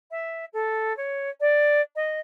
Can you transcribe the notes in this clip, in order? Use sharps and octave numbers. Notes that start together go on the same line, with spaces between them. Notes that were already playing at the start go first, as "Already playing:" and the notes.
E5
A4
C#5
D5
D#5